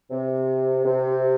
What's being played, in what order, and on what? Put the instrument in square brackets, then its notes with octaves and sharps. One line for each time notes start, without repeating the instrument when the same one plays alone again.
[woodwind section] C3
C3